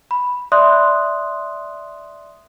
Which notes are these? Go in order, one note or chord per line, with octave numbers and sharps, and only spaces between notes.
B5
D5 E5 C6 D#6 F#6